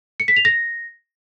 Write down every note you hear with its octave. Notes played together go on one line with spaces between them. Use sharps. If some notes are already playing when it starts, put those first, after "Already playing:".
C#7
B6
F7
A#6